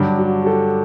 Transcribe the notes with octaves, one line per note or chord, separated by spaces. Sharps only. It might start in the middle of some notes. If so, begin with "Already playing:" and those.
Already playing: G2 D3 F#3 G4
F#4
G4
A4